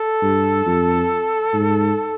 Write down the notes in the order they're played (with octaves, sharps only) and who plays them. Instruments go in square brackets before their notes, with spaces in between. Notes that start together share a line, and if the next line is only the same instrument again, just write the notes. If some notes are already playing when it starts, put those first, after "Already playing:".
Already playing: [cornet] A4
[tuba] G2
F2
G#2